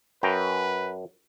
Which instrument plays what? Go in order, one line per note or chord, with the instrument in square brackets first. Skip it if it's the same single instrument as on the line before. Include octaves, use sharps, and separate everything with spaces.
[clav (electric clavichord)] F#2 G5 A#5 [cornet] B4